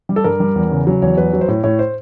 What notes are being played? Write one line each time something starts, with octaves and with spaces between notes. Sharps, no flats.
G3
A4
G2 A#4
G3
E2
C#3
F#3
E2 C#5
F#3 B4
F#3
C5
A2 C#5
A2 C#5
C5